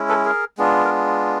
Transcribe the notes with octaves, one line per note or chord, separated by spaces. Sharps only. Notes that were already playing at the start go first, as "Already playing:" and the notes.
Already playing: G#3 C#4 E4
A4 B4
G#4 A#4
G#3 B3 D4 F4
A#4